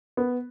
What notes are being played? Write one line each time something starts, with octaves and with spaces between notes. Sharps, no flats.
B3